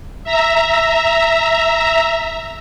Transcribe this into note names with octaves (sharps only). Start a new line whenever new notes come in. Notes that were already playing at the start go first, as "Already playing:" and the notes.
E5 A#5